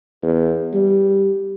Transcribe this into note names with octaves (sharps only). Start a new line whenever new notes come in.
E2
G3